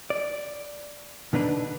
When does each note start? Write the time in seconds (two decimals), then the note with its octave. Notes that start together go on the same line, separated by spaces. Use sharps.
0.10 D5
1.33 B2 D3 B3 D4 D#4 B4